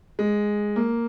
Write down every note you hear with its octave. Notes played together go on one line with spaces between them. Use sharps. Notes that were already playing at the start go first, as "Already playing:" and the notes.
G#3
A#3